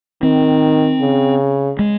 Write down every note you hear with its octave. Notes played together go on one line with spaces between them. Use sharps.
D#3 C4
C#3
G#3